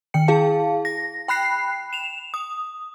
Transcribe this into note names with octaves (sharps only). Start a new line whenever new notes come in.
D#3 G5 C#7
E4 G#4 F5 A5
A#6
G5 B5 F#6 C7
E7 F7
D#6